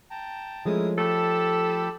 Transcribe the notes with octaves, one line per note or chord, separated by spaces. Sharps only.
G5 A5 A#5
F3 G#3 A3 C#4 E4 A#4 D#6
G4 A4 A5 B5